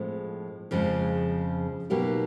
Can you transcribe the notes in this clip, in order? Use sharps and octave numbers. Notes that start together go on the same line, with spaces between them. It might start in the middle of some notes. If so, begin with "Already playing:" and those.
Already playing: A2 F3 G#3 C4
F2 C#3 F3 G#3
B2 F#3 A#3 D#4 G4